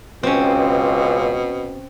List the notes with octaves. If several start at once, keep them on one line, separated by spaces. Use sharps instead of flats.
C#2 B2 C4 C#4